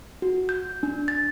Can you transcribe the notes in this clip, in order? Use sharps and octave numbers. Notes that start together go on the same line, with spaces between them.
F#4
G6
D4
A6